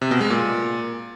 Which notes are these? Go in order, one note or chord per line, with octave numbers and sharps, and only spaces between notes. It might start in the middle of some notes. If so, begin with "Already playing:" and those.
C3
B2
G#3
A#2